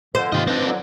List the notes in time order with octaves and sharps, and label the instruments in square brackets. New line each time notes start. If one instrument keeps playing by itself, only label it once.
[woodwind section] F2 D3 [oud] C5
[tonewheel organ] G#2 C3 D#3 [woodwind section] F4 [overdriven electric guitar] G4 D#5
[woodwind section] F3 D4 [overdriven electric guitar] C4 D#4 [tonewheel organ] B4 D6
[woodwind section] F2 D3 F#3